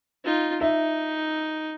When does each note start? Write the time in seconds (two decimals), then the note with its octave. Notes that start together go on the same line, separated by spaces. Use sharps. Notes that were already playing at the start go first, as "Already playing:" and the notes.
0.24 D#4 F4
0.61 D#4 E5